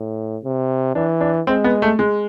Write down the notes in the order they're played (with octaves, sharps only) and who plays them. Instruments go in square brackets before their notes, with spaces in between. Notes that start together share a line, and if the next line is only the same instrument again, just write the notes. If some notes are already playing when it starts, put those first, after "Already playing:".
Already playing: [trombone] A2
C3
[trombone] E3 [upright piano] D4
[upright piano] D4
[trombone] G#3 [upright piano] C4
[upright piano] B3
A3
G#3